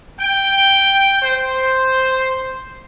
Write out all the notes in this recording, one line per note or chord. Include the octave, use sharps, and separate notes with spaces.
G5
C5